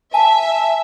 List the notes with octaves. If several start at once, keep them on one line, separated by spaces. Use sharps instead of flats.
E5 G#5 A5